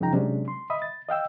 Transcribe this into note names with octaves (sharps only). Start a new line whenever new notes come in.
F#2 C#3 F3 D#4 G5 A#5
C3 F#3 G#3 C#4 D4
C6
D#5 E5 B5 D#6
A6
D#5 F5 G5 E6